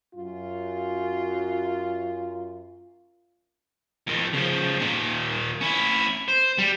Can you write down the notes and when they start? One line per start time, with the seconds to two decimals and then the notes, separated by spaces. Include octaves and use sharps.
0.15 F#2 F4
4.07 F2 D#3
4.33 C#3 F3
4.79 A#2 D#3
5.61 C#4 E4
6.28 C5
6.58 G3